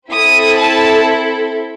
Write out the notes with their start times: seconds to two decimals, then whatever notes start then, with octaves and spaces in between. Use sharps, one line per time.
0.12 C4 E4 A4 D#6
0.58 A5